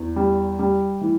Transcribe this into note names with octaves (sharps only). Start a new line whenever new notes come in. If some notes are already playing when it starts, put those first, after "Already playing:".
Already playing: E2
G3
G3
E3